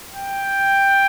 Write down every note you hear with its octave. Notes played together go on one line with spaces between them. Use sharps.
G5